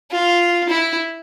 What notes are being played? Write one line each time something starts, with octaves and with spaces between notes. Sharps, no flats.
F4
E4